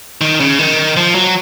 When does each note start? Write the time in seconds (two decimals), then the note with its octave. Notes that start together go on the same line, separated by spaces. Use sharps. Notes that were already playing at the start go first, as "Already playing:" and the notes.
0.21 D#3
0.40 C#3
0.59 D#3
0.97 F3
1.15 F#3